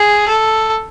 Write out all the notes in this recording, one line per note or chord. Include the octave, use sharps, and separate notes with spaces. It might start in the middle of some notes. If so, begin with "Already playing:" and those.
Already playing: G#4
A4